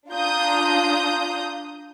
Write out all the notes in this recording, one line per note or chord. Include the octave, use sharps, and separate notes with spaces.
D4 F4 A#5 D#6 G6